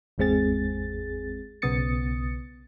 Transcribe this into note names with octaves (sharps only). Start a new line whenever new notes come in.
G#1 E2 G#3 C4 G#4 A6
B1 C#3 B3 D#6 A6 C#7